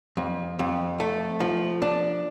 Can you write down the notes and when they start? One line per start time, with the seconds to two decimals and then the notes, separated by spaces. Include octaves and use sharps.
0.17 F2
0.59 F2
1.00 A3
1.40 F3
1.82 D4